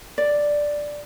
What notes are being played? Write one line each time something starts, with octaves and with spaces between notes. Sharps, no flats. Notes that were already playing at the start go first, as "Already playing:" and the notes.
D5